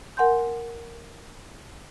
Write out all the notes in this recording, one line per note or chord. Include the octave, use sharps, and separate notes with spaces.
A#4 F#5 G#5 C6 G6